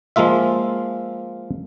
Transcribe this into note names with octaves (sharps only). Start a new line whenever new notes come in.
F3 G#3 A#3 F4 E5